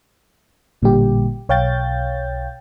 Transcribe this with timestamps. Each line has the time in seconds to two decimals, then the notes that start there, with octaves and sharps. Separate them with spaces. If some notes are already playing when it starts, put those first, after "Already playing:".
0.82 A1 A#2 D3 G3 G4
1.49 B1 C#5 F5 G5 G6 A6